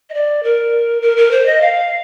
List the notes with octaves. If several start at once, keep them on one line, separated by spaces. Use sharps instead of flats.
D#5
D5
A#4
A#4
A#4
C5
D#5
F5